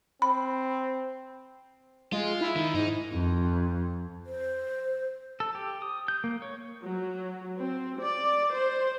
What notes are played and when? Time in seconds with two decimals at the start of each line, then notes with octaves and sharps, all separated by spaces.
0.22 C4 B5
2.12 G#3 F4
2.41 E4
2.56 D#3
2.75 G#2 D#4
3.14 F2
4.26 C5
5.40 A4
5.55 G4
5.82 D#6
6.08 G6
6.24 A#3
6.42 C#5
6.83 F#3
7.59 C4
8.00 D5
8.53 C5